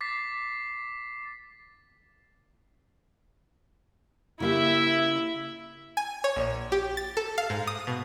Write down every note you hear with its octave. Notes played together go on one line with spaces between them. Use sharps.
D6 A6 B6 C7
C#3 A#3 E4 G4 E5
G#5
C#5
A#1
G4
A6
A4
F5
G#2
D#6
B2